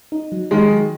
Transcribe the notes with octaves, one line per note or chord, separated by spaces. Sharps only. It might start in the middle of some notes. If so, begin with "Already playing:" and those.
D#4
F#3
D#3 G#3 D#4
F#3